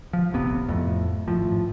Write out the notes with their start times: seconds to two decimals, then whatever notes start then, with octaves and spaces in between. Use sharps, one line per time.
0.13 F3
0.33 D#1 A1 C3 B3
0.68 F2 A2
1.28 G#1 A2 F3